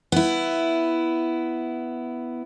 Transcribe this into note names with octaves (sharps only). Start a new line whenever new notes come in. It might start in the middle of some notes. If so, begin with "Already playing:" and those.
B3 E4